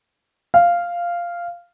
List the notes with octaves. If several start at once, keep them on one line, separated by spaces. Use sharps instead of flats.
F5